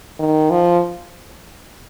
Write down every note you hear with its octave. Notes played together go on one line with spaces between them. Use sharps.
D#3
F3